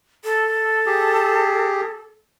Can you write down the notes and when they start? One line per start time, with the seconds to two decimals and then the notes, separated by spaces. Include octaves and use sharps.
0.24 A4
0.86 G4 G#4